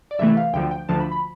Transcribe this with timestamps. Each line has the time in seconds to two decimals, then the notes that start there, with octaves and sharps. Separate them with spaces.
0.11 D5
0.19 C2 C3 E3 A3 E5
0.37 F5
0.53 D2 D3 F3 G5
0.71 G5
0.89 D2 D3 F3 A5
1.00 B5
1.12 B5